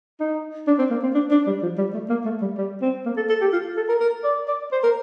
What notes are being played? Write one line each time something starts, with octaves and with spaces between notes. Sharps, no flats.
D#4
D4
C4
A#3
C4
D4
D4
G3
F3
G3
A3
A#3
A3
G3
G3
C4
A#3
A4
A4
G4
F4
A4
A#4
A#4
D5
D5
C5
A#4